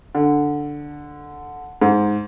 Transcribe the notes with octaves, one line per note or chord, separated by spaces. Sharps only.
D3
G#2